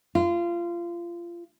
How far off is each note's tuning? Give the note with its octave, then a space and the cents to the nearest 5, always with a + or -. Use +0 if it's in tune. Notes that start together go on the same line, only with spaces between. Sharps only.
F4 -25